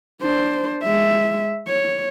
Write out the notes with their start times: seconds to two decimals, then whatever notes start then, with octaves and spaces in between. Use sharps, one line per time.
0.22 D4 C5
0.83 G#3 E5
1.68 C#5